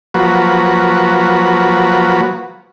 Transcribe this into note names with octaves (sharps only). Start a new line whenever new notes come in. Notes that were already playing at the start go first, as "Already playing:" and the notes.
F3 F#3 A#3 F#4 B4